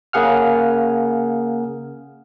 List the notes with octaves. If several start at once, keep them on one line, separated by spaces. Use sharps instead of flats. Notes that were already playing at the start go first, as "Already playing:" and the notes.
C#3 A#3 G#4 F#5 F6